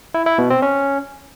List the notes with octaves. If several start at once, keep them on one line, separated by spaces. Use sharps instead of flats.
E4
E4
B2
C4
C#4